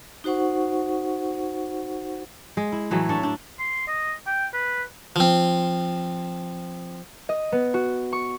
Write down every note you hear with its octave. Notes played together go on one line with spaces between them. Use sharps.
D#4 F#4 C5 F#5 C#6
G#3
E4
A2 E3 F#3 A3
D4 A4 C#5 E5
D4
C6
D#5
G5
B4
F3 C4
D#5
B3
F#4
C#6